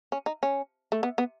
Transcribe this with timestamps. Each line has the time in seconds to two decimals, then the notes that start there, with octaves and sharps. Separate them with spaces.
0.12 C#4
0.26 D#4
0.43 C#4
0.92 A3
1.03 B3
1.18 B3